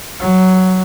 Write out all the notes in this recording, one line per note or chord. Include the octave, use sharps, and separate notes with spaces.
F#3